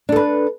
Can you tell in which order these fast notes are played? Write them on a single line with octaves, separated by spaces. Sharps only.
D4 A4 B4